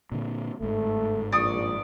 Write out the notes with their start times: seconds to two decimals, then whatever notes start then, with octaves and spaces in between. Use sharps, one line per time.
0.12 A#2 D3
0.61 G1 G#2 A3
1.32 A#1 D5 C#6 D#6